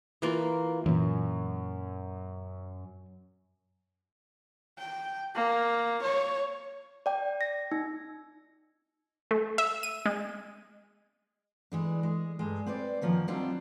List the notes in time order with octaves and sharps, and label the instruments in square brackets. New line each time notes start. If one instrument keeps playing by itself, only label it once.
[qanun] E3 A#3 F4
[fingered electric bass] F#2 [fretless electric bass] A#2 E3
[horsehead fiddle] G5
A#3
C#5
[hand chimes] D5 G5
A#6
D#4
[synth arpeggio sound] A3
E5
D#7
G#3
[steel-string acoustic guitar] E3 G#3 D4
G#3
G2 G#3
C4 B4 C5 D5
F#2 B2 D#3 F3 A#3 C#5
F#3 G3 C4 D4 D#4 F4